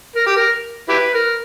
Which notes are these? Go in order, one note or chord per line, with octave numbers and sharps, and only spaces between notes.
A#4
G4
A#4
E4 G4 B4
A#4